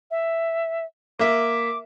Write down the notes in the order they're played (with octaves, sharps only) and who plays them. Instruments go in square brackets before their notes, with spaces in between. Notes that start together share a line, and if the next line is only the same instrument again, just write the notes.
[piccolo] E5
[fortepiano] A#3 E5 [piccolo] D6